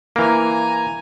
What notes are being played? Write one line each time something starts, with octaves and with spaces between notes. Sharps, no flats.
E3 A#3 G#5 A#5